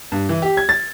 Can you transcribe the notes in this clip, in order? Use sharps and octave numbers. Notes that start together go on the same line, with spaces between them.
G2
E3
G4
G#6
A6